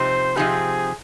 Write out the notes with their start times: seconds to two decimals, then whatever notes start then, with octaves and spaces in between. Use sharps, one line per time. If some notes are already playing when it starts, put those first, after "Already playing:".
Already playing: C3 F3 C4 D#4 G4 C5
0.36 C3 F3 C4 D#4 G4 G#4